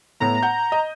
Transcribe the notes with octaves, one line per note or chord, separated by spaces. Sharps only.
A2 A3 B3 A#5
F#5 G6
D#5